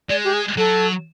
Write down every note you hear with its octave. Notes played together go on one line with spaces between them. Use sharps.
G#3 D5
G4
G#4
F#3 A4